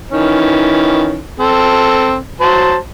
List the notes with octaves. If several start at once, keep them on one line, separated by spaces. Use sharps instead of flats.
D#3 E3 C#4
C4 A4
F#3 C5 A5